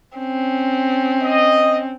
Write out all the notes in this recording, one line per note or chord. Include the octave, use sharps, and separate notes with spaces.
C4 C#4
D#5